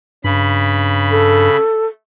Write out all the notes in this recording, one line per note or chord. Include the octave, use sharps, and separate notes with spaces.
G2 C#3 B5
A4